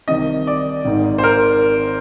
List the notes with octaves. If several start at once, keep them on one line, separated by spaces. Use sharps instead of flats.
C2 C3 D#3 D#5
D5
G#1 G#2 D#3
C5
A#4